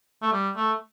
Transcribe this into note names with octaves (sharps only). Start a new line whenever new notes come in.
A3
G3
A3